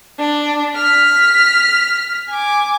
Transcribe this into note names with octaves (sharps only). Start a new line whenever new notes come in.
D4
F6 B6
G#5 D6